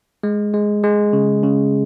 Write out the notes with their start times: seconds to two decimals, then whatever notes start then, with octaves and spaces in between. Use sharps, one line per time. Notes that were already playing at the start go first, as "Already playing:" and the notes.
0.23 G#3
0.54 G#3
0.84 G#3
1.13 C#3
1.43 C#3